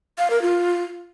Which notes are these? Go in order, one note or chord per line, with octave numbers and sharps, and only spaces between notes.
F5
A#4
F4